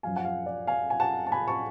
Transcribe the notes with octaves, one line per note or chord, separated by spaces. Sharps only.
F#2 F3 F5 G#5
F#5
F5
D5
F5 G#5
G#5
F#5 A5
A5
G#5 B5
A5 C#6